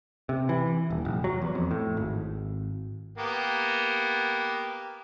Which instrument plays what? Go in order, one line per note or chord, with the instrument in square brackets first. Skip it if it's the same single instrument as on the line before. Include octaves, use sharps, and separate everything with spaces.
[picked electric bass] C3
E3
D#1
F1
F#3
E2
F2
A2
G#1
[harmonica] A#3 B3 G4